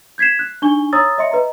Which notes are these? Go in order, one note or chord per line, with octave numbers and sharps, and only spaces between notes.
G6 G#6 B6 C7 E7
F#6
D4 D#4 G#5 C#6 G7
C#5 A#5 D#6 E6 A6
C#5 D#5 E5 C6 C#7
B4 D#5 A#5